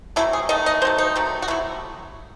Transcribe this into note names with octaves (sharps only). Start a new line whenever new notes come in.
C3 F#3 A3 E4
G#4
D#3 A3 D#5
D#5
D#3 F#3 A3 C5
D#4
C3 F#3 A3
F#4
C3 F#3 A3 E4